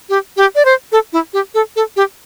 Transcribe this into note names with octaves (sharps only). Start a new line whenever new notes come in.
G4
G4
D5
C5
A4
E4
G4
A4
A4
G4